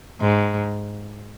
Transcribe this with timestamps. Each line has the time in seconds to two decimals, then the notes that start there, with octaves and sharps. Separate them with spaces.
0.21 G#2